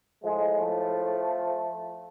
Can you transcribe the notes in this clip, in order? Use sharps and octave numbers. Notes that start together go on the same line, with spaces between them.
A2 F3 G#3
F3 A3